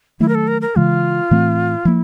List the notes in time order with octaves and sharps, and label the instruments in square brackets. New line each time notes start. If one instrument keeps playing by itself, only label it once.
[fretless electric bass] D#3 F#3 A3 [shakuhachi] E4
[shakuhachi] A#4
A4
A#4
A#4
[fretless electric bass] C#3 E3 G#3 [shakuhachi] F4
[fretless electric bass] A2 E3 A3 C4
[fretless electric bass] F3 A#3 [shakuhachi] E4